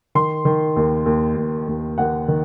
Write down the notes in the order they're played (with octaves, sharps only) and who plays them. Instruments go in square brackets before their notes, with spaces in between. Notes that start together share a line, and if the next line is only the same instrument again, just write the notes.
[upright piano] D#3 C6
D#3
D#2
D#2
D#2
D#2
D#2 F#5
D#3